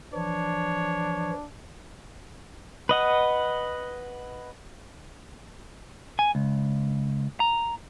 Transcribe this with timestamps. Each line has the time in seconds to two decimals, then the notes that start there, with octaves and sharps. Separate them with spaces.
0.14 E3 F3 D4 C#5
2.89 B4 D#5 F#5
6.19 G#5
6.35 C#2
7.40 A#5